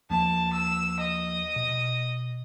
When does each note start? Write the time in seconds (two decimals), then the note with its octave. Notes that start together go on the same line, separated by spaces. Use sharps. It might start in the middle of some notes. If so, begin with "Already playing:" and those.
0.10 D#2 F3 A#3 A5
0.53 E6
0.99 D#5
1.56 B2